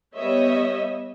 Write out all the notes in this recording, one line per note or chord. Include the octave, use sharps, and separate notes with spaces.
G3 B3 C#5 D#5 E5